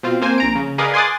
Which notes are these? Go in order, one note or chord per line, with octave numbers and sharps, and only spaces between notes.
B2 C4 F4
A#3 C4 C5 G#5
A#1 A#5 D7
C#3
G#4 A#4 B4 D5 D#5 F5
G#5 C6 D6 D#6 F#6 A6